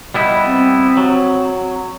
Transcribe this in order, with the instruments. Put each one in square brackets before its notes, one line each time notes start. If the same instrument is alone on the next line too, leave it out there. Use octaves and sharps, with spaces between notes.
[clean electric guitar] G3 B3 E4 [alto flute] D#5
[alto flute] C4
[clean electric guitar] F#3